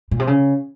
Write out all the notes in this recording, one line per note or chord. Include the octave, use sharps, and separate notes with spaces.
A#2
C3
C#3